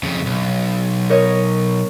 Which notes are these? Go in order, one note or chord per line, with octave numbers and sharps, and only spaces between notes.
F2 C#3
B1
A#4 C#5 D#5